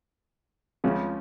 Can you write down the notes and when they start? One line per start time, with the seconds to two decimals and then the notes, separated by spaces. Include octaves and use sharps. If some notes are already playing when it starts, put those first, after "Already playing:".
0.84 C#2 C#3 F3 C#4